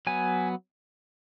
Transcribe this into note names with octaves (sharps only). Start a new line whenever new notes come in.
F#3 B3 G#5